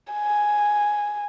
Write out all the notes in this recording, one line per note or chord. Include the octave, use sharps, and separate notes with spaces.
G#5